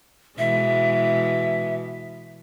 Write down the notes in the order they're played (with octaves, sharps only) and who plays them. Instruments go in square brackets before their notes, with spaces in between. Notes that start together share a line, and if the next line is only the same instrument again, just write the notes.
[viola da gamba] B2 E3 G#3 [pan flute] E5